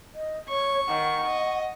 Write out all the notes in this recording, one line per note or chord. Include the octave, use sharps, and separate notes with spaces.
D#5
C#5 C#6
D#3 F#5
D#5